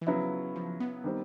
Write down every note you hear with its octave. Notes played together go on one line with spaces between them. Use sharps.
E3
C#3 F3 F#3 B3 E4
F3
B3
D#3 G3 C4